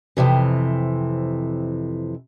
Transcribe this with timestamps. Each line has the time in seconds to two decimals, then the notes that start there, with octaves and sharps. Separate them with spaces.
0.17 F2 A2 C3 E3